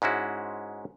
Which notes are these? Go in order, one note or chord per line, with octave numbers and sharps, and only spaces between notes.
G#2 G#3 C#4 E4 F#4